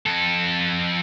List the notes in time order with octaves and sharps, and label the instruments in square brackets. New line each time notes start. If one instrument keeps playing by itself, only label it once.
[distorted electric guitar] F2 A4